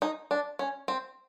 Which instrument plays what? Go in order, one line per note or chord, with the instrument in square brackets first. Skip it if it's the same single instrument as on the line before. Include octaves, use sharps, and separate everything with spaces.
[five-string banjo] D#4
D4
C#4
C4